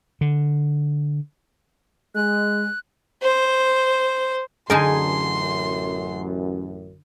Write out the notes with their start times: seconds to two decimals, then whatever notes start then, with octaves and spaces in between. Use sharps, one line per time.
0.21 D3
2.15 G#3 F#6
3.23 C5
4.70 A1 F#2 D3 D#4 G#4 A#4 G#5 C6